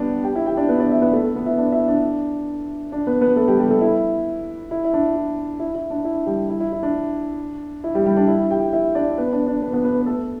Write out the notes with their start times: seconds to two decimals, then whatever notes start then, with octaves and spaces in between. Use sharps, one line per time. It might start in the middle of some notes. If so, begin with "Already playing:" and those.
Already playing: G3 B3 D4 G4 B4 D5
0.24 G4 G5
0.35 E4 E5
0.46 G4 G5
0.57 D4 D5
0.69 B3 B4
0.80 D4 D5
0.91 E4 E5
1.02 B3 B4
1.13 A3 A4
1.24 A3 A4
1.35 B3 B4
1.46 E4 E5
1.58 D4 D5
1.72 E4 E5
1.87 D4 D5
2.92 D4 D5
3.07 B3 B4
3.21 B3 B4
3.36 A3 A4
3.48 G3 G4
3.59 G3 G4
3.70 A3 A4
3.81 E4
4.71 E4
4.84 E4
4.93 D4
5.16 E4
5.59 E4
5.75 E4
5.90 D4
6.05 E4
6.26 G3 G4
6.49 E4
6.60 E4
6.72 E4
6.83 D4
7.84 E4
7.95 G3 G4
8.06 G3 G4
8.17 D4
8.28 E4
8.51 G4 G5
8.73 E4 E5
8.95 D4 D5
9.18 B3 B4
9.32 D4 D5
9.47 D4 D5
9.62 B3 B4
9.73 B3 B4
9.84 B3 B4
10.02 B4
10.06 A3 A4